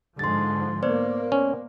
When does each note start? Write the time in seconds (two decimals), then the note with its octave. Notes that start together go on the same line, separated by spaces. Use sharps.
0.19 G#2 D3 F3 C6 A6
0.83 A#3 B3 C5 D5
1.32 C#4